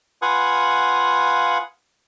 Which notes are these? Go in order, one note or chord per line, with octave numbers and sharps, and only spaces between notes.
F4 B4 F5 F#5 G#5 D#6